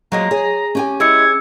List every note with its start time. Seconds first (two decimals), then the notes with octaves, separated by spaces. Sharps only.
0.12 F3 F#3 G#3 A#3 A#5
0.31 G#4 C#5
0.75 C#4 G4 G#5
1.00 G#3 E4 G#4 E6 G#6 C#7